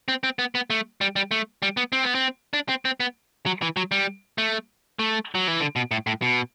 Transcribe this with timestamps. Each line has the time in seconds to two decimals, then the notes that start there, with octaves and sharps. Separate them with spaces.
0.08 C4
0.24 C4
0.39 B3
0.55 B3
0.70 A3
1.01 G3
1.16 G3
1.31 A3
1.62 G3
1.77 B3
1.93 C4
2.04 B3
2.15 C4
2.53 D4
2.69 C4
2.85 C4
3.00 B3
3.46 F#3
3.62 E3
3.77 F#3
3.92 G3
4.38 A3
4.99 A3
5.35 F#3
5.48 E3
5.61 D3
5.76 B2
5.91 A2
6.07 A2
6.22 B2